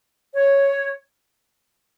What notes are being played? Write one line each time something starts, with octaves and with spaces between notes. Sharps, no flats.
C#5